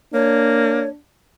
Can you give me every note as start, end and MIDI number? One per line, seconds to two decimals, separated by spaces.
0.14 0.88 58
0.14 0.96 62
0.14 0.89 73